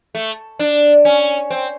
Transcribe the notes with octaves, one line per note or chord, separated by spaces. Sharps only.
A3
D4
C#4
C4